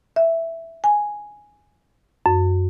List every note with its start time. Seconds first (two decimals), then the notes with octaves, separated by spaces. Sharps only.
0.16 E5
0.84 G#5
2.26 F#2